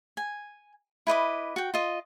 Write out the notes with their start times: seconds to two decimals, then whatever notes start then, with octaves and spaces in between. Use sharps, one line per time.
0.17 G#5
1.07 E4 B4 D#5 D6
1.56 F#4 G5
1.74 F4 D#5